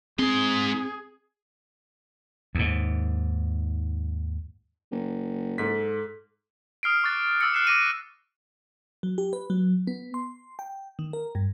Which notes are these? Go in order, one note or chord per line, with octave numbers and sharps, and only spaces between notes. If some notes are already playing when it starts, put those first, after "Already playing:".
G#2 C4 G#4 C6
D#2 G#2
F#1
G#2 A4 B6
D#6 F6 C7 D7
C#6 D6 F#6 A6
D6 E6 A6 C#7
F6 F#6 C7 C#7 E7
D6 A#6 D#7
F#3
G4
B4
F#3
B3
C6
G5
D#3
A#4
G2